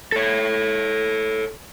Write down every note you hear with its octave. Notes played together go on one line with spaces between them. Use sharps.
A4 C#5